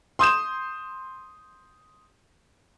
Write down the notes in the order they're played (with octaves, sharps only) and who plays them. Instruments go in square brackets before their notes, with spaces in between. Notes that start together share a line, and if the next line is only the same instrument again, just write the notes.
[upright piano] C6 D#6 G6 E7